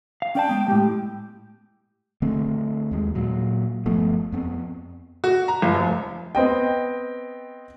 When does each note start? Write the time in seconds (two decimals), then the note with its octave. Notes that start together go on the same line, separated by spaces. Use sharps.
0.22 F5
0.35 C#4 D5 G5 A5
0.49 G#3 B3
0.68 A2 G#3 G4
2.22 D3 A3 C4
2.91 D#2 G#3
3.15 A#2 F#3
3.86 G1 F3 A3 B3
4.32 F2 B3 C4
5.24 F#4
5.48 A#5
5.62 G1
5.75 F1
6.35 B3 C4 D#5 G5